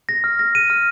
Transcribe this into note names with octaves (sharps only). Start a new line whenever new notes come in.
A#6
F6
A#6
D#7
F6